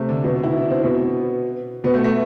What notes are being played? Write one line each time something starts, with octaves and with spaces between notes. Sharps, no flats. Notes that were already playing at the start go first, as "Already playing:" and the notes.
Already playing: C3 A3
D3 D4
B2 B3
E4
D4
C4
B2 B3
B2 B3
A3
A3